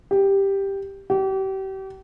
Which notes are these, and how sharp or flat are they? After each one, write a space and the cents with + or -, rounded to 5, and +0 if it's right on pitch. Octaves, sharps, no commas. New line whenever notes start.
G4 +5
G4 -35